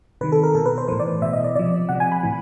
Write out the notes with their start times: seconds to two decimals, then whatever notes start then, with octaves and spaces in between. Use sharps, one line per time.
0.21 C3 D#3 B4
0.32 A4
0.43 A#4
0.55 B2 A4
0.66 B4
0.78 C5
0.88 A2 E3 C5
1.00 D5
1.22 B2 E5
1.33 D#5
1.44 D5
1.55 C3 F3 D5
1.89 C3 F3 F#5
2.00 G#5
2.12 B5
2.23 A2 E3